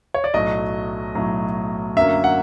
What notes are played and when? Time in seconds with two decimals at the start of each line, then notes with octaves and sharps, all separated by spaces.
0.14 C#5
0.24 D5
0.34 B1 A2 F#3 A3 D#5
1.15 B1 A2 F#3 A3
1.96 F#2 D3 F#3 A#3 E5
2.24 F#5